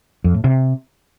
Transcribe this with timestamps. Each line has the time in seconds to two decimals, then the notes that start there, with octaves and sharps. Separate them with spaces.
0.24 F2
0.34 A2
0.44 C3